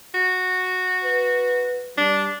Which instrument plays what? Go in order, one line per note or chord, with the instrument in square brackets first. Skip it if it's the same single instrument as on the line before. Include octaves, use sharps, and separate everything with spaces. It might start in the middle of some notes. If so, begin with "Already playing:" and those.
[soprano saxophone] F#4
[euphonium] B4
[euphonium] G3 [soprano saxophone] D4